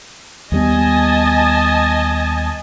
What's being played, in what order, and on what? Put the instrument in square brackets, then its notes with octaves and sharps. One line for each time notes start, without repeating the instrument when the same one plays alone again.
[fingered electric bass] D#2 G3 B3 [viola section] D#5 G#5 A5